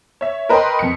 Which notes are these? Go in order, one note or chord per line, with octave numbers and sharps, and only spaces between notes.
C#5 E5
A#4 B4 D#5 G5 B5 C6
F2 C#7